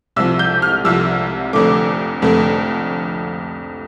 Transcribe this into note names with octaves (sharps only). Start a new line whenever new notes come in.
C2 C3 F3 E6
G6
F6
C2 C3 F3 E6
F1 F2 D3 A3 D6
F1 F2 D3 A3